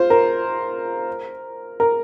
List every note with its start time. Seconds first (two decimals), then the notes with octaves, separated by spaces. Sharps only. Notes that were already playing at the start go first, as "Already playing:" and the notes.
Already playing: F4 C5
0.10 A#4
1.80 A#4